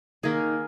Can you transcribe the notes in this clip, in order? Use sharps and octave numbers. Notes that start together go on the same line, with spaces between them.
D#3 A#3 D#4 G#4